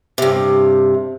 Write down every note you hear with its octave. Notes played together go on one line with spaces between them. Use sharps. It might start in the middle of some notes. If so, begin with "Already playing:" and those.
G2 C3